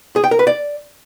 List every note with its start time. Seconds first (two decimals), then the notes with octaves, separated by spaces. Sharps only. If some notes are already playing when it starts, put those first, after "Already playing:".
0.16 G#4
0.24 G5
0.31 A#4
0.39 B4
0.47 D5